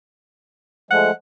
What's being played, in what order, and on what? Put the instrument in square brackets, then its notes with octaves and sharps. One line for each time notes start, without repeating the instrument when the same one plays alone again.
[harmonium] F3 G#3 A3 [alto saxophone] F#5